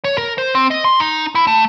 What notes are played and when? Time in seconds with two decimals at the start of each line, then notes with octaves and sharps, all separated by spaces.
0.04 C#5
0.18 A#4
0.38 C5
0.55 C4
0.71 D#5
0.84 C6
1.00 D#4
1.35 E4
1.47 A3